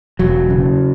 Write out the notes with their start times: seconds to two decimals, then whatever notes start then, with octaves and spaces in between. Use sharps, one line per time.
0.19 E1 F#3
0.50 C#3